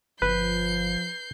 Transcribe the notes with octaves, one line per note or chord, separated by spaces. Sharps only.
G1 F3 B4 G6 C7